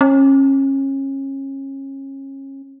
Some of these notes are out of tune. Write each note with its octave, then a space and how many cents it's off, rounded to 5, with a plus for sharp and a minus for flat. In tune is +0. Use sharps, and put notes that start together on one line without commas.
C#4 -30